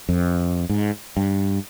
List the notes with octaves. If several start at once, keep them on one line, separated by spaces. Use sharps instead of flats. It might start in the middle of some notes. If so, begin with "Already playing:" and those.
F2
G#2
G2